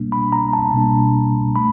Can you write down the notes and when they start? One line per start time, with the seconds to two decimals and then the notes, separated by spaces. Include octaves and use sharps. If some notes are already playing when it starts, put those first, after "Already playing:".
Already playing: B2 G3 A#3 D4
0.12 B5
0.32 A#5
0.53 A5
0.74 B2 G3 A#3 D4
1.56 A3 B5